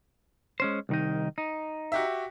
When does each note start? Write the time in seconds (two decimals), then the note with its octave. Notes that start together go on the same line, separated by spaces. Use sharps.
0.60 G#3 C#4 C5
0.89 C2 D#3 D#4
1.38 D#4
1.92 F#4 G4 E5